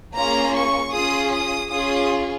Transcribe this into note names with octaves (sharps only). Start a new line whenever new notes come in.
A#3 C#4 F4 G#4 A#5
C#6
C#4 F4 G#4 D#6
D#6
C#4 F4 G#4 D#6